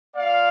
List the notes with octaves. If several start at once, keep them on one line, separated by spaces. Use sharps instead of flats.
A#3 F4 D5 F5